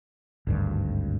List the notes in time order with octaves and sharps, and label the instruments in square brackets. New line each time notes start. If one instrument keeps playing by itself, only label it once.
[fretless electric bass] G#1 D2 G2